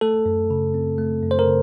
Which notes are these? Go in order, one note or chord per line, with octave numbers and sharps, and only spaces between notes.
A3 A4
F#2
C#3
C4
A3
F#2
C5
A#4
C#3